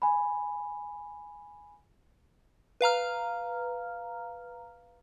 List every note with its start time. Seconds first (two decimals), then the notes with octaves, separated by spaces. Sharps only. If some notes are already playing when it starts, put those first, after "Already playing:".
0.02 G#5 B5
2.81 B4 F5 A#5 F6